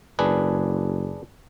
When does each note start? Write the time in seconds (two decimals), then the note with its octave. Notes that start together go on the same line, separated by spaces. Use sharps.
0.19 F#1 D4 G#4 B4